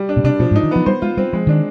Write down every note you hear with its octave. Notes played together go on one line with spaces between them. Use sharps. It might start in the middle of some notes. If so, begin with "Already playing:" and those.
Already playing: G3
D4
B2
C3 D4
B2 F3
G#2
D#4
D#3
F3 B3
G3 C5
G#3 F4
G3 C4
F3 G#3
D#3 D4